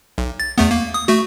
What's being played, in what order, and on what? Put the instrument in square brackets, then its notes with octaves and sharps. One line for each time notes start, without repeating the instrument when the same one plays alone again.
[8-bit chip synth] B1
A6
E2 A3 B3
A#3
D#6
A3 F#4